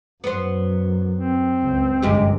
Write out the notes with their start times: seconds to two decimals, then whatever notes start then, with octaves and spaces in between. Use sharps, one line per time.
0.24 F#2 B3 C5
1.15 C4
1.64 C#2
2.03 G1 F#2 C3 G#3 G4